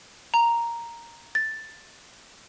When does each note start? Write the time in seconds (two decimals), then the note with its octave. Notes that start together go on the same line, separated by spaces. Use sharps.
0.34 A#5
1.35 A6